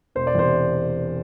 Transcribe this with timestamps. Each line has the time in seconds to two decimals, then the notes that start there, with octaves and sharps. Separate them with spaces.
0.15 E1 C5
0.27 D5
0.35 E2 C3 C5